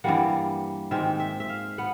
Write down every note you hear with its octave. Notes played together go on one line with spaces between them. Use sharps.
G2 E3 G3 A#3 F#5
G#2 D#3 G#3 C4 E5
E5
E5
F5
B3 F#5